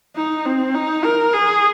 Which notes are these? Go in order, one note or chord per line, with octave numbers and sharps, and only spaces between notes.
D#4
C4
D#4
A#4
G#4